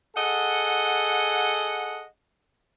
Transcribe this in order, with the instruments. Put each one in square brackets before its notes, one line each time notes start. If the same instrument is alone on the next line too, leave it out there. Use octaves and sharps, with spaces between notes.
[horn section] G#4 A4 D#5 F#5